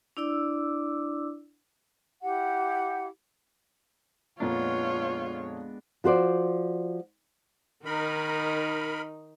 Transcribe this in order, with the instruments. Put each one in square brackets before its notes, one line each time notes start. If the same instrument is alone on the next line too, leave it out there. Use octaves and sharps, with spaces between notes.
[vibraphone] D4 E4 D5 D6 E6
[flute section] E4 G4 F#5
[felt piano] F2 A#2 A#5 [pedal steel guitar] G#3 B3 D4 [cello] F4 [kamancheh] C#5
[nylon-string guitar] F3 F#4 C5 D5
[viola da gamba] D#3 D#4 [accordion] A#4 B5